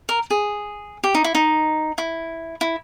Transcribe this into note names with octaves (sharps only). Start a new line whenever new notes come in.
A#4
G#4
G4
D#4
E4
D#4
E4
E4